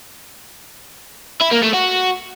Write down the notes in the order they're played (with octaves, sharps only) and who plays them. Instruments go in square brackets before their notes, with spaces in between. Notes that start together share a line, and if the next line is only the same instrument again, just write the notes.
[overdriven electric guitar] E4
A#3
A3
F#4